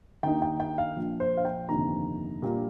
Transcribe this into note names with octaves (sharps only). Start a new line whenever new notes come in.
D#2 D#3 A#3 D#4 G5
G5
G5
F5
A#1 A#2 F3
C5
F5
G5
G1 F2 C3 D#3 A#3 A#5
A#1 A#2 G3 A#3